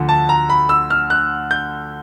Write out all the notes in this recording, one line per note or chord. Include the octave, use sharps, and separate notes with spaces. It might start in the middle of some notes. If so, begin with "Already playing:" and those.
Already playing: D2 D3 F3
A5
A#5
B5
E6
F6
F#6
G6